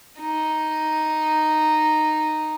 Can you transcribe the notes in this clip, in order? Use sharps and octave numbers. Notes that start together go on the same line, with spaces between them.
D#4